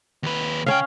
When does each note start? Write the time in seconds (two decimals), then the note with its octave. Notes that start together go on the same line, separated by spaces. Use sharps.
0.23 D#2 B4
0.66 C#3 C#4 F5 G5